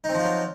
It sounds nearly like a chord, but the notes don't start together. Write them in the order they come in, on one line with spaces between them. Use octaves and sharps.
D#4 C4 F3 F4 F#3